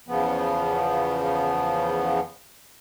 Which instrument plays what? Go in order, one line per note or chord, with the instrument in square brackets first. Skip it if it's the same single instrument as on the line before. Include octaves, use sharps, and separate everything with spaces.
[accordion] E2 C#3 F3 B3